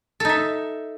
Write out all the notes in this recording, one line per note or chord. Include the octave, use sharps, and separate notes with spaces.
D#4 A4 E5